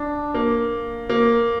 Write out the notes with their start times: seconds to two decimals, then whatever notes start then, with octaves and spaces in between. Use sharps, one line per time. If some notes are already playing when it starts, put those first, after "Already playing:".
Already playing: D4
0.34 A#3
1.09 A#3